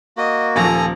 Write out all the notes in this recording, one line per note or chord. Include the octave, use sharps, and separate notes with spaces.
A#3 F#4 D#5
D#1 F3 A4 G#5 A#5